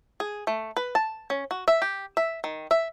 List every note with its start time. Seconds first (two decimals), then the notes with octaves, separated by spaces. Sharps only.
0.20 G#4
0.47 A3
0.77 B4
0.95 A5
1.30 C#4
1.51 F#4
1.68 E5
1.82 G4
2.17 E5
2.44 D#3
2.71 E5